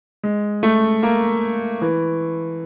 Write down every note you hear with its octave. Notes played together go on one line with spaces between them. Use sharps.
G#3
A3
A#3
E3